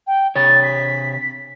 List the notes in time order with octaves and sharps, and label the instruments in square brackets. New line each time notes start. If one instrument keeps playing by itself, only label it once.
[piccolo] G5
[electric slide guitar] C3 C#5 [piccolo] A6
[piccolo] B6